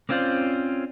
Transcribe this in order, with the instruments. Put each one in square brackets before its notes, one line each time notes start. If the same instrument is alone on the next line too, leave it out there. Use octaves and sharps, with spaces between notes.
[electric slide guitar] A#3 C4 C#4 F4 C5 D5